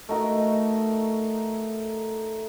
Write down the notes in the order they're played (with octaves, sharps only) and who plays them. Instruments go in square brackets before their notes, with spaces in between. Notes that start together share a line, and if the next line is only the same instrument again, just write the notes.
[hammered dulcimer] A3 D#4 F#4 A#4